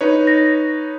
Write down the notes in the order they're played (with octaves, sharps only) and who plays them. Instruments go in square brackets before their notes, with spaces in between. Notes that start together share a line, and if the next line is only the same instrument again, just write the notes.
[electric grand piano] D#4 B4 C#5
[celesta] A#6